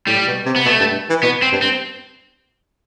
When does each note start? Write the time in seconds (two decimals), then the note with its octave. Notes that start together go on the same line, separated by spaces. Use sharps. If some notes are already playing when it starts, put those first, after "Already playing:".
0.07 A2 G3
0.27 B2
0.45 C3
0.56 B3
0.65 B2 A3
0.80 G2
1.09 E3
1.23 B2 B3
1.42 C4
1.52 G2
1.62 C4